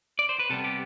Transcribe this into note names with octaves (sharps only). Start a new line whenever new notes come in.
D5
C5
B4
C3 G3 B3 A4
G4